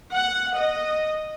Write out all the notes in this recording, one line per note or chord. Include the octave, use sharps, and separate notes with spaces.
F#5
D#5